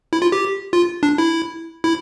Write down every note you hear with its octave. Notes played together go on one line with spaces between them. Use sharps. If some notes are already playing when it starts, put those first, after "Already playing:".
E4
F4
G4
F4
D4
E4
E4